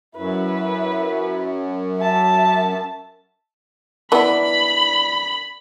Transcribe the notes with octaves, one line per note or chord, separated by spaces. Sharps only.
F#2 E4 B4
E5 A5
E3 B3 D4 A#4 B5